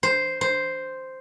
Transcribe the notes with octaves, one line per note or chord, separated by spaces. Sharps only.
C5
C5